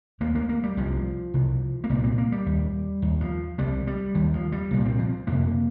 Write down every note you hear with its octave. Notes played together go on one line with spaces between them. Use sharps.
D#2 A#3
A#3
A#3
G3
C2 C3 F3
C2 C3
A#3
C2 A#2 G3
C4
A#3
G3
D#2
D#2
F3
C2 C3 G3
G3
D#2 D#3
F3
G3
C2 A#2 A#3
C4
F3
F2 C3 A#3